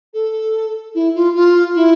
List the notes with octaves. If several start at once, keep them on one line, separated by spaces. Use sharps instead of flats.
A4
E4
F4
F4
E4